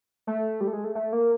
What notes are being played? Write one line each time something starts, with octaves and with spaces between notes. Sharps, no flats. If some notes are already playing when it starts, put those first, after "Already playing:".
A3
G3
A3
G#3
A3
A3
A#3